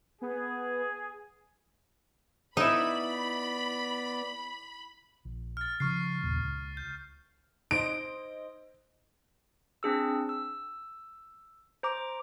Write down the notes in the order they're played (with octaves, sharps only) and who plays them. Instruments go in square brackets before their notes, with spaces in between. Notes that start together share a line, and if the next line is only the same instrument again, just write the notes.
[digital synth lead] B3 [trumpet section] G#4
[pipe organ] B3 D5 [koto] D#4 E4 [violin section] B5
[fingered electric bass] A#1
[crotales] F6 A6
[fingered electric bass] C#3 E3 F3 [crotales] C#6 F6 C7
[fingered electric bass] G1 D#2 A#2
C#2
[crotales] G6
[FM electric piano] D#4 C5 D#5 [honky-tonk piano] D7
[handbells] C4 D4 G#4 E6
E6
C5 A#5 D6